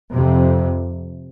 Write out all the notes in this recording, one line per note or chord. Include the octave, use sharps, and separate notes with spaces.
F2 C3